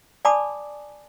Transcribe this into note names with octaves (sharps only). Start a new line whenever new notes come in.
D5 G#5 A5 B5 D6 D#6